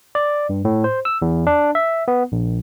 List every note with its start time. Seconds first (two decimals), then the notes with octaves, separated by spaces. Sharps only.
0.15 D5
0.49 G2
0.65 A2
0.84 C5
1.05 E6
1.22 E2
1.47 D4
1.75 E5
2.08 B3
2.32 A#1